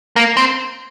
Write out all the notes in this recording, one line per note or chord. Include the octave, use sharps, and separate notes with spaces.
A#3
C4